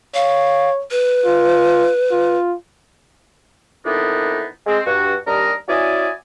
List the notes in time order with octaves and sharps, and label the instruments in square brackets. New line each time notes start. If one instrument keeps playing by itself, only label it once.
[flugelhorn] C#5 [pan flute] F5
[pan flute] B4
[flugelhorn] F4
F4
[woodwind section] F2 D#3 E3 B3 D4 D#4
G#3 C4
G2 F#4
D#2 G3 D4 A#4 D#5 A#5
C#4 E4 F#4 D5 D#5 G#5